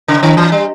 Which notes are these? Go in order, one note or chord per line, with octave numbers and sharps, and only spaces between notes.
C#3
D#3
E3
G3